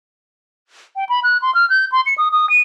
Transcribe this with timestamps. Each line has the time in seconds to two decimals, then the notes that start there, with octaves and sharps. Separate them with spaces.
0.96 G5
1.09 B5
1.24 F#6
1.42 C6
1.55 F6
1.70 G6
1.92 C6
2.06 C#7
2.18 D#6
2.32 D#6
2.50 D#7